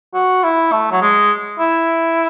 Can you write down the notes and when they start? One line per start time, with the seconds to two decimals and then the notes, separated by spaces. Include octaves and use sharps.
0.14 F#4
0.43 E4
0.72 A3
0.91 F#3
1.01 G#3
1.59 E4